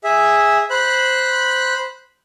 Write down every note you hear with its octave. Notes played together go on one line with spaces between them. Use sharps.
G#4 E5
C5 B5 F#6